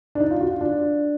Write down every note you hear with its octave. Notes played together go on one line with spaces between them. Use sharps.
D4
D#4
F4
F#4
F4
D4